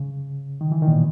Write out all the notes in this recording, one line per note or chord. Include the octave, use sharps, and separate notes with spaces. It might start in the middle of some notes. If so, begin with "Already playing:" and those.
Already playing: C#3
D#3
E3
D#3
A#2
B2